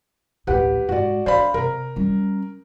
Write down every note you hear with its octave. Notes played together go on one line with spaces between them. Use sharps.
A1 D2 G4 B4 F#5
G#2 F#4 D5
D4 C5 D5 F5 B5
C3 A#4
G3 C#4